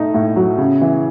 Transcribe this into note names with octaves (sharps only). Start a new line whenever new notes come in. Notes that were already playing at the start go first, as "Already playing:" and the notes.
Already playing: A2 A3 D#4
A2
F#3
C#3
E3